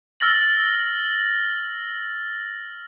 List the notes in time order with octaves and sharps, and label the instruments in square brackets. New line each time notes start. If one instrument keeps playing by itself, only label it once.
[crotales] E6 F6 A6 A#6 F#7